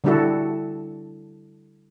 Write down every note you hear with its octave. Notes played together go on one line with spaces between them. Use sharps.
D3 G3 D4 E4 F#4 A4